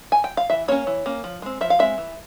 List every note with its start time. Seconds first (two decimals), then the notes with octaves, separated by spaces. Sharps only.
0.12 G#5
0.24 G5
0.37 F5
0.50 E3 E5
0.68 A#3 C#4 C#5
0.87 E3
1.06 A#3 C#4
1.24 F3
1.42 G#3 C4
1.61 F3 E5
1.70 F5
1.79 G#3 C4 E5
1.98 E3